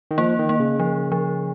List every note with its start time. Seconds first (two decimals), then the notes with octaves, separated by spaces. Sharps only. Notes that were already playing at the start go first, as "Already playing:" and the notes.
0.11 D#3
0.18 F3 A#3
0.39 D#3
0.49 A#3
0.60 C#3
0.80 F3
1.12 F3